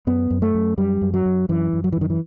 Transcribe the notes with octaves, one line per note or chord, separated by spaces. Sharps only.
F#2 B3
F#2
A3
F#2
F#2 G3
F#2
F#3
F#2
F#2 E3
F#2
F#3
E3
F#2 D#3
E3